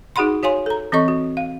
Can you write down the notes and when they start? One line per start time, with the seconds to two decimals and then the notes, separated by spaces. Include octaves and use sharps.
0.16 D#4 F#4 G#4 F#5 B5 C6
0.43 F#4 C#5 F5 G#5 C6
0.66 A4 A#5
0.92 E3 C4 A4 D#5 C#6
1.08 F#4
1.37 F5